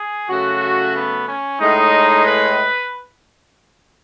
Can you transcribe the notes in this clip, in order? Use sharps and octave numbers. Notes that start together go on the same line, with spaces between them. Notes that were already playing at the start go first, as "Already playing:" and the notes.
Already playing: G#4
C#3 F#3 A3 F#4
B3
C#4
A2 G#3 D#4
B4